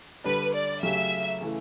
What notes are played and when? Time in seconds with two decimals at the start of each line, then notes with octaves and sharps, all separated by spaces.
0.24 D3 G3 D4 G4 B4
0.54 D5
0.83 C#3 F#3 A3 C#4 G4 E5
1.41 C#3 E3 A3